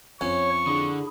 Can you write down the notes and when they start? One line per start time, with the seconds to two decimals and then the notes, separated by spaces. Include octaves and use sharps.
0.21 F2 C#4 C#5 C#6
0.67 D3 E4 G#4